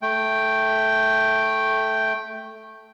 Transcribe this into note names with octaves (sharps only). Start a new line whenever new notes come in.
A3 G5